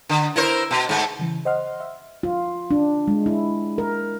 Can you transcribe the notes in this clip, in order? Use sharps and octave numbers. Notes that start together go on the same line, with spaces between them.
D3
E4 A#4 C5
B2
G#2 A3
C#3 E3
C5 D#5 F#5 C6 F6
E5
F4
D4
G#3
E4
A#4